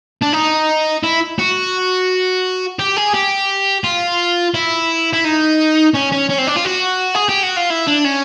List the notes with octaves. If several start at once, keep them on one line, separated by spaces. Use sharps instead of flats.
D4
D#4
E4
F#4
G4
G#4
G4
F4
E4
E4
D#4
C#4
C#4
C#4
C4
D4
F4
F#4
G#4
G4
F#4
F4
E4
D4
C#4